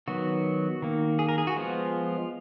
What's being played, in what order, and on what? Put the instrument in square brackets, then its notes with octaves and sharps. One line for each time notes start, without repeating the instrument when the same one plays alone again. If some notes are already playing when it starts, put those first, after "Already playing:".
[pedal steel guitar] D#3 F#3 B3 F#4
D#3 A#3
G#4
A#4
G#4
F#4
F3 G#3 B3 F4